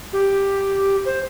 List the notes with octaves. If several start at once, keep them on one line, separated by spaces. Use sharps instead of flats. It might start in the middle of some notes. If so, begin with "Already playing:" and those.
G4
C5